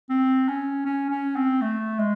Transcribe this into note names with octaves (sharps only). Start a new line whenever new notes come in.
C4
C#4
C#4
C#4
C4
A3
G#3